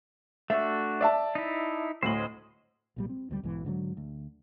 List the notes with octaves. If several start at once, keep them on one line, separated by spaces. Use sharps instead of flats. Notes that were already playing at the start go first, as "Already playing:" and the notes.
A3 D4 F#4 E5
D5 E5 A5
D#4 E4
D2 A2 C5 D#5 F#7
B1 A#2 G3
C4
F1 D2 G#2 G3
B1 G#2 B2 E3
G#2 D3 E3 F#3
D2